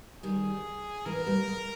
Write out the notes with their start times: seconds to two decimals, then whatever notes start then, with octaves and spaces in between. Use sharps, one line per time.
0.23 D#3 G3 G#4
1.06 E3 G#3 A#4
1.19 B3
1.27 G3 A#3
1.48 G#3 B3